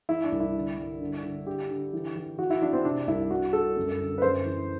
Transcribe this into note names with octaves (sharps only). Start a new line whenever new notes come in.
E3 E4
D4
C2
E4
D3
G2
D3
D3
D3 G4
D3
E3
E3
E3 F#4
E4
E3 D4
C4
C3 D4
C2 E4
G2 F#4
G2 A4
F#2
D3
B4
F#2 C5
E3